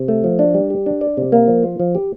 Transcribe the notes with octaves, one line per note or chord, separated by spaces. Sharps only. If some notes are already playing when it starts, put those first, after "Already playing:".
Already playing: C3
A3
F3
D4
G3
G4
D4
D5
C3
A#3
F3
F4
F3
G4